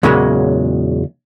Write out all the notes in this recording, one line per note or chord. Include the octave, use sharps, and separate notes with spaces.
E2 A#2 C#3 F#3 G#3 A#3